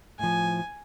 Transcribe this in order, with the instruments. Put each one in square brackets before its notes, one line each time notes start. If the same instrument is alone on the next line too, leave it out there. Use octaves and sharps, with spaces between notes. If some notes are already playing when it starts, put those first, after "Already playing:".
[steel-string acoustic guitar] A2 F3 [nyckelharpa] G#5